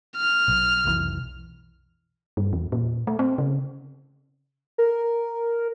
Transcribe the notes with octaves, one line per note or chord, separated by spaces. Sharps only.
F6
B1
F1 B1 E3
G2
E2
A#2
A3
C4
C#3
A#4